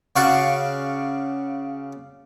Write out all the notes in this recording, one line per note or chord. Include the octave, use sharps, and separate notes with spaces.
C#3 F#4 D5 F5 C#6